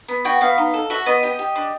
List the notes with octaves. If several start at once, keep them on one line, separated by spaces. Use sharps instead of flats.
B3
F#4 G5
B3 F5
D#4
A4
F#4 E5
B3 D#5
G4 D#5
G4
D4